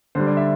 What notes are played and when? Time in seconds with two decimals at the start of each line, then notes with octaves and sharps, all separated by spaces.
0.15 D3 G3 D4 C5
0.27 D5
0.37 E5